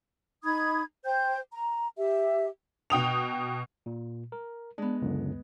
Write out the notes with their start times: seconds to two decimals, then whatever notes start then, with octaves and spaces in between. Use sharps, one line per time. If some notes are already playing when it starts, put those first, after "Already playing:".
0.44 D#4 B5 D#6 G#6
1.05 C5 G5 G6
1.52 A#5
1.98 G4 E5
2.90 B2 G5 D#6 F7
3.86 A#2
4.32 A#4
4.78 G#3 B3 D4
5.02 C#2 F#2 D3